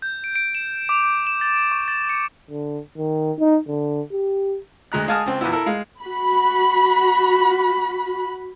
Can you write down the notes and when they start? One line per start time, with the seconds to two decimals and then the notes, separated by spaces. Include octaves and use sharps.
0.02 G6
0.24 D7
0.36 D7
0.55 E7
0.89 D6
1.03 D6
1.27 E7
1.41 A6
1.56 D7
1.72 C#6
1.88 A6
2.09 C#7
2.50 D3
2.97 D#3
3.39 D#4
3.68 D3
4.12 G4
4.92 D2 G#3 A#5 F#6
5.08 G#3 F5 G#5 A5 D#6 F6
5.26 C#2 C4
5.41 E2 A#2 B3 E4
5.52 E4 A4 A#4
5.66 G#3 F5
6.03 F#4 B5